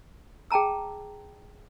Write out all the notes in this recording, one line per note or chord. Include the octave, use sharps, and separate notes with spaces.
G#4 G5 A5 A#5 E6